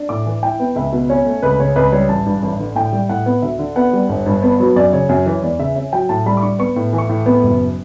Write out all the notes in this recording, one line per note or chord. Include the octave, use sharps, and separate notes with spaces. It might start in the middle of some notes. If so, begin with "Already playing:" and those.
Already playing: D4
A2 D6
E3
E4 G5
B3
C#2 E5
B2
C#4 C#5
A3
C#2 B4
C#3 C#5
C#2 B4
G3 C#5
A1 A5
G2
A1
D3
A2 G5
G3
A2 F#5
B3
D2 E5
D3
B3 F#5
G3
G1
G2
B3
F#3
F#2 D5
C#3 C#5
F#2 C#5
E3 C#5
E2 D5
C#3 E5
C#4 E5
F#3 G5
A2 A5
G3 B5
D6
D4 C#6
B3 C#6
A2
E3
C#6
A2
B3
F#1